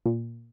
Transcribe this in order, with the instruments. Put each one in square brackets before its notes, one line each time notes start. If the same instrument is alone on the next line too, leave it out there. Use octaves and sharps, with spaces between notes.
[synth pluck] A#2